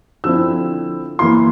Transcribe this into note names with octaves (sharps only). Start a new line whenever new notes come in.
D3 F3 C4 E4 E6
E3 A#3 E4 C6